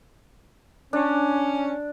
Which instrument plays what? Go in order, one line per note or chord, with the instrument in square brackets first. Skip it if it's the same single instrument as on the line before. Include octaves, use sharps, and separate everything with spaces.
[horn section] C#4 [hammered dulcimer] D4